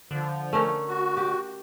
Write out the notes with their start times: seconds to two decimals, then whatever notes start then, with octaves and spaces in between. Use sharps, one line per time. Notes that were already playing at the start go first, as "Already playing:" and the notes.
0.11 D3 F3
0.53 A3 C#4 A#4
0.88 F#4
1.17 G4